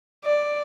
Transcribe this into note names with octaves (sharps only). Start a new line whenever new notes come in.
D5